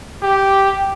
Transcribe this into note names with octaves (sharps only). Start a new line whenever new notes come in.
G4